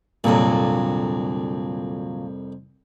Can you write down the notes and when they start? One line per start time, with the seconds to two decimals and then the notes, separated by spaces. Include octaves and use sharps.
0.24 C2 F2 A#2 D3 F#3